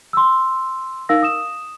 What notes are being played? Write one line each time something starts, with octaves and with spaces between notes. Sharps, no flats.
C6 E6
D#4 A#4 F5 E6 A#6
D#6 E7